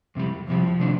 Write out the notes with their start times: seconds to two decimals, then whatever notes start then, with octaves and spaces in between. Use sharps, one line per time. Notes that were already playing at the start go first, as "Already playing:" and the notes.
0.15 F2 C3 G3
0.47 F2 C3 F3 G3
0.80 C3 D#3 A3 D4